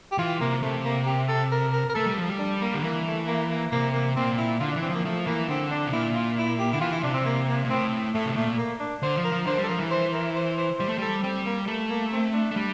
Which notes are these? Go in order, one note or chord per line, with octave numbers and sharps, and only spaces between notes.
G4
E3 F4
C3 A#3
C3 A3
A#3
G4
A4
A#4
A#4
A#4
A3 A4
G3
F3
G3
D4
A#3
D3
E3 A#3
A3
A#3
A#3
C3 A#3
A#3
A#2 C4
E4
D3 F4
D4
E3
C4
F3 A#3
F3 A3
E3 A#3
D3 C4
D4
C3
A#2 E4
F4
E4
G4
D3 E4
E3 F4
E4
C3 D4
C4
A#3
A#3
A#2
A2 C4
A2 A3
C3
A#2 A3
A#3
D4
D3 C5
F3
A#4
F3
D3 C5
G3
A4
F3 A#4
E3
C5
A#4
C5
C5
G3 C5
A3
G3 A4
G3 C4
A#3
A3
A#3
C4
D4
A3
G3